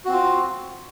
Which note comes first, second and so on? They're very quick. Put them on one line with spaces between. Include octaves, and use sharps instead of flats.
F#4 C4 F4